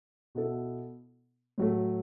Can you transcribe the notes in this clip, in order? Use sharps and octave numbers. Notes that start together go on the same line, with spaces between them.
B2 B3 E4 A4
A2 F#3 A3